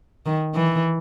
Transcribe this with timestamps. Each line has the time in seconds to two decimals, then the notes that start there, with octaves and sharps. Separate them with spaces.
0.26 D#3
0.55 E3